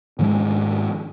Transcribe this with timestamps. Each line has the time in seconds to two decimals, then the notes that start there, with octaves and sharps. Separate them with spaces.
0.19 G#2 D#3 F3 G#3